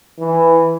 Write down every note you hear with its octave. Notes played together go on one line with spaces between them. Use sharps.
E3